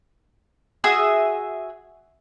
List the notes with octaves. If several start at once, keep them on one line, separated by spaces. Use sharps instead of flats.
F#4 G#4 E5 D#6